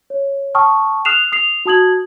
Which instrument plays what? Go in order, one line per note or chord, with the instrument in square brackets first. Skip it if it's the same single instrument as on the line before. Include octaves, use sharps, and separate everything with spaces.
[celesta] C#5
G5 A5 C#6 D#6 F6
D#6 F6 F#6 C7 E7 F7
D#6 C7 F7
F#4 A5 D#6 G#6 F#7